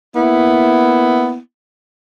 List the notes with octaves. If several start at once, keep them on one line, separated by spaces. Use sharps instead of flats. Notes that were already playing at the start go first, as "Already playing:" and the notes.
A#3 B3 E4